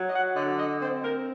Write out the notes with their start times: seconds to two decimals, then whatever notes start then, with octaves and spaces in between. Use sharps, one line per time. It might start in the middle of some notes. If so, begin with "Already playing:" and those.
Already playing: F#3
0.09 D#5
0.14 F#5
0.36 D3 D#5
0.58 D#5
0.81 C4 C5
1.04 A#4